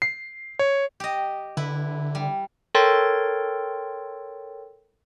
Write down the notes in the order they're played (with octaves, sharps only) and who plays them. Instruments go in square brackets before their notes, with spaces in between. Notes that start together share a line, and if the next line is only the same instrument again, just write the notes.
[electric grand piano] C7
C#5
[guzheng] G4 D#5
[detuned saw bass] D3 [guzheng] E4 B4
[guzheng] G3
[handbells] A4 A#4 C#5 G5 C6 A6